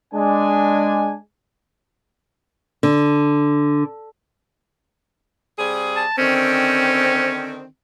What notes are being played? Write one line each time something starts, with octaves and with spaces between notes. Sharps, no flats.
G#3 D4 G#5
D3
C3 G3 G#4
A5
D3 D#3 C4 C#4
C#4